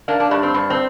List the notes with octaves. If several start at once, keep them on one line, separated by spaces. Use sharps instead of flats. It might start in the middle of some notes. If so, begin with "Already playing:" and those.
A#3 D4
D4
G2 D4
C4
G2 D4
C4